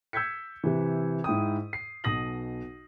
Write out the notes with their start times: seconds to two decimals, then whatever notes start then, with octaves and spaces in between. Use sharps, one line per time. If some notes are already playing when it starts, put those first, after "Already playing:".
0.13 E6 G6 G#6 B6 C#7
0.64 C3 E3
1.24 G#2 E4 G5 D#6
1.73 C7
2.04 B1 B2 D#6 A#6 F#7